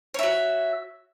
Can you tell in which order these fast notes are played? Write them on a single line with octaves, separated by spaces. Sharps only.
C#5 E5 F#4